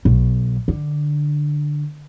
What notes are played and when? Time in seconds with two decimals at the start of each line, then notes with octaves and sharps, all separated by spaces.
0.05 B1
0.68 D3